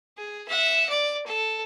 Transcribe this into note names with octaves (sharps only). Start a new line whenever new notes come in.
G#4
E5 F#5
D5
A4